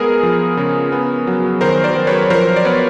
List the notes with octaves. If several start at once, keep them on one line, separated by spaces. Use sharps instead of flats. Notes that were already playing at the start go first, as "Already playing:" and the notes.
Already playing: G#3 B3 G#4 A#4
F3
C#3
B3
F#3
D#3 A#4 C5
C5 D5
F#3
B4 C#5
F3 A#4 C5
D5
B3 B4 C#5